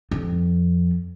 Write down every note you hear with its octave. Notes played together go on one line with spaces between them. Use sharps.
F2